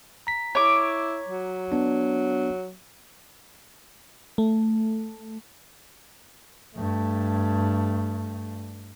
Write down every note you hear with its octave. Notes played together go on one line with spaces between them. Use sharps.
A#5 B6
E4 C#5 D6
F#3
B3 D4
A3
G2 A3